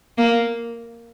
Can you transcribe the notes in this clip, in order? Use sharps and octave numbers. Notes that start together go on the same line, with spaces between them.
A#3